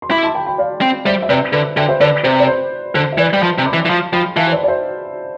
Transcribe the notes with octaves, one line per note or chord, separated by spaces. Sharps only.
C6
E4 B5 D6
A5 C6
G5 B5
G5 B5
D5 F5
C4
G3 C5 E5
E5
C3 B4 D5
D3 B4
D3 E5 G5
C5 E5
D3 B4 D5
C3 C5
D5
C5
D3 C5
E5
E3 B4 D5
G3 B5
F3 A5 C6
C3
B5 D6
E3
E3
F3 A5 C6
F3 G5 B5
E3 F5 A5
C5
B4 D5
D5
C5 E5